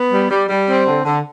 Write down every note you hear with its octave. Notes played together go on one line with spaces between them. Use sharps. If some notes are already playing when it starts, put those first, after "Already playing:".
Already playing: B3
G3
G3
G3
C4
D3
D3